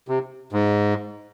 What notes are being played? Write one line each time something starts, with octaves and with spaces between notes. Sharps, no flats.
C3
G#2